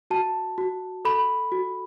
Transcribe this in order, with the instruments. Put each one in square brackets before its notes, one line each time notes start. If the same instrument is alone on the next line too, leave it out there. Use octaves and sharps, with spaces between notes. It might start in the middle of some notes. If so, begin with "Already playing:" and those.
[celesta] F#4 A5
F#4
A4 B5
F#4